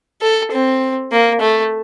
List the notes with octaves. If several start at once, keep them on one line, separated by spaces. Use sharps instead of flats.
A4
C4
A#3
A3